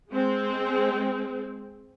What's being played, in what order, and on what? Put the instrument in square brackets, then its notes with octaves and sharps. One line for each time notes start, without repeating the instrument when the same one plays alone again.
[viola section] G#3 C4